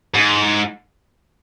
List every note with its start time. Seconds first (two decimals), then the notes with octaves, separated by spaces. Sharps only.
0.14 G#2